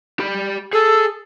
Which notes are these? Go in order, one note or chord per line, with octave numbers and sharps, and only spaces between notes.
G4 B5
G#4 A4